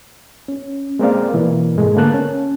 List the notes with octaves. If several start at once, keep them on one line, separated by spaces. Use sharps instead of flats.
C#4
G#3 A#3 C4 A#4 D5 F5
B2 E3 A#3
G#2 G#3 A3
D3 A#3 B3 A5 F#6
C#4